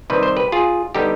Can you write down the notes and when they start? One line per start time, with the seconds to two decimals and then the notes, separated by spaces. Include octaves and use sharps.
0.10 C3 D#3 G3 B4
0.23 C5
0.37 G4 B4
0.52 F4 G#4
0.95 D3 G3 B3 D#4 G4